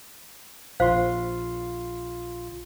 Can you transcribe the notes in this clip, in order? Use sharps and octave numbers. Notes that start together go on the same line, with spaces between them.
A#1 F4 C5 F5 C6